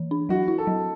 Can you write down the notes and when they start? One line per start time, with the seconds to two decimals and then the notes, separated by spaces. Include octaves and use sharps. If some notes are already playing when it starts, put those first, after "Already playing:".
Already playing: E3
0.11 D4
0.29 F#3 F#4
0.48 E4
0.58 A4
0.67 F#3